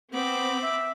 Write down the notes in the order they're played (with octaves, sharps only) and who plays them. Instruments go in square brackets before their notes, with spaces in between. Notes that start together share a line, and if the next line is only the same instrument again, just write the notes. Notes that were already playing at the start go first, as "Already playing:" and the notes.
[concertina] B3 [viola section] C4 [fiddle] B5 D6
[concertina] E5